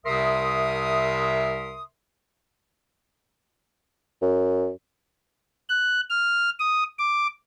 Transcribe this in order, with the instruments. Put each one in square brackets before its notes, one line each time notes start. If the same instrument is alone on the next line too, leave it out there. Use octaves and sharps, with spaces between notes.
[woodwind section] C2 C3 A#4 E5 C6 D#6
[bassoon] F#2
[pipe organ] F#6
F6
D#6
D6